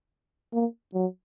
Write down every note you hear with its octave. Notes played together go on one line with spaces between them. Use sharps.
A#3
F#3